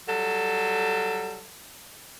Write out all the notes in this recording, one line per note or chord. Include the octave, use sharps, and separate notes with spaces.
F#3 G3 A4